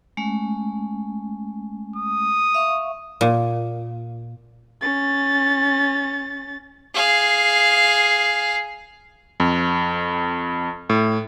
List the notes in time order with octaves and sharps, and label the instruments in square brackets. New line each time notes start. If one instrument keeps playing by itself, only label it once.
[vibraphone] G#3 A3 C#4
[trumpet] D#6
[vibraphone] E5 F5 C#6
[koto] A#2
[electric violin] C#4 A6
[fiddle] G#4 F5
[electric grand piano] F2
A2